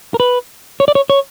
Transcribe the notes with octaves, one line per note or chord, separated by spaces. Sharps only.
A#4
B4
C#5
D5
C#5
C#5